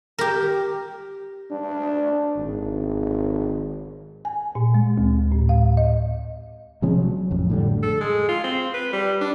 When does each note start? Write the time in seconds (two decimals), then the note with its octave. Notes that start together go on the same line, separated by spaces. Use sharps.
0.19 G4 A#4
1.51 D4
2.36 G#1
4.25 G#5
4.55 A#2
4.74 G#3
4.98 D2
5.32 A2
5.49 F5
5.77 D#5
6.82 C3 F3 G#3 C#4
6.97 F#3
7.31 A1 F2
7.50 A2 D3 G3
7.83 A4
8.00 G#3
8.28 F4
8.44 C4
8.74 B4
8.93 G3
9.21 D4